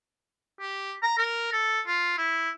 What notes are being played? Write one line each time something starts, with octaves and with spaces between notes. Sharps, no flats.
G4
A#5
A#4
A4
F4
E4